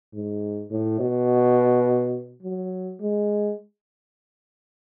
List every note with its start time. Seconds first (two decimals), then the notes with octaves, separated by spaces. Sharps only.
0.13 G#2
0.71 A2
1.00 B2
2.43 F#3
3.00 G#3